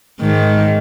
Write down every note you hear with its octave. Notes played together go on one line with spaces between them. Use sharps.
G#2 D#3